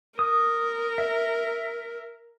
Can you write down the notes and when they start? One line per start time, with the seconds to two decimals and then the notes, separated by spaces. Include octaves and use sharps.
0.19 A#4 D#6
0.98 E5